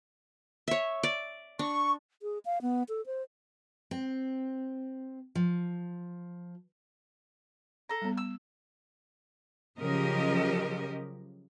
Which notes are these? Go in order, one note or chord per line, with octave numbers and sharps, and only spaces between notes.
C#5 E5
D5
D4 C#6
G#4
F5
B3
A4
C5
C4
F3
A4 A#5
G3 B3
E6
C#3 F3 F#3 G4 A#4 D#5